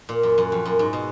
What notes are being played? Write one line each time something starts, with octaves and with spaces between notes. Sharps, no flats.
A#2
F#2
F#2
F2
F#2
G#2
B2